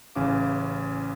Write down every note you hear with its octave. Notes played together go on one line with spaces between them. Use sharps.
A1 C#3 E3 C#4 F5 D6